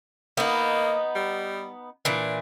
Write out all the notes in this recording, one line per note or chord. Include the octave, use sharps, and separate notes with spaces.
A#3 B3 D#4
G3
A#2 E3 D4